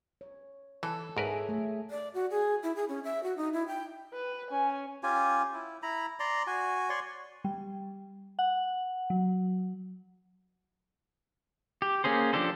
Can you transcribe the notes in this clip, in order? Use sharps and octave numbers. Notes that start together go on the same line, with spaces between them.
C#5
E3 A4
G#2 G#4 A#4 B4 C#5 E5
A3
D5
F#4
G#4
E4
G#4
C#4
E5
F#4
D#4
E4
G5
B4
C#4 G#5
C#4 F4 G4 G#5
E4
E4 A#5 B5
D5 A#5 C6
F#4 G#5
C#5 D5 C6 C#6
G3
F#5
F#3
G4
A#3 C#4 G#4 C5
F3 D4 G4 A4 C5